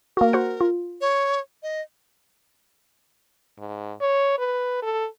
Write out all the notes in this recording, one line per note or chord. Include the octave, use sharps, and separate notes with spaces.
A#3 F#4 A#4
F#4 C5 F#5
F4
C#5
D#5
G#2
C#5
B4
A4